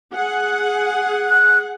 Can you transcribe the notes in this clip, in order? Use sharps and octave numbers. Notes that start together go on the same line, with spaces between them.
G#4 F#5
F#6